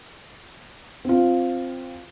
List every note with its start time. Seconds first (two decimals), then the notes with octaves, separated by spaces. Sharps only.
1.05 C4 F4